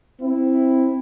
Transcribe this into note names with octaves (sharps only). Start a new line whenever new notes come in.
C4 E4